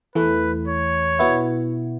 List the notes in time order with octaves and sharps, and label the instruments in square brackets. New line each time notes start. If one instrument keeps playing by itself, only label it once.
[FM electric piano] E2 E3 A3 [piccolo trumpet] B4
[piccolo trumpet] C#5
[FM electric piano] B2 B3 E4